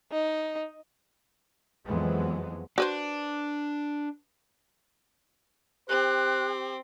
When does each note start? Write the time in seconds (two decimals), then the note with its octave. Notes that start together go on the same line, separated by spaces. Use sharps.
0.12 D#4
1.85 F2 E3 F#3 G#3 B3
2.78 D4 F#4 B4 C5
5.89 C4 G4 C5 F#6